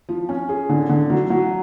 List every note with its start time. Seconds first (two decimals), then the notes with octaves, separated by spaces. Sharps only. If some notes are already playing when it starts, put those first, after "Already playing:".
0.09 F3
0.29 C#4
0.49 G#4
0.69 D3
0.89 D3
1.10 F#3
1.30 F#3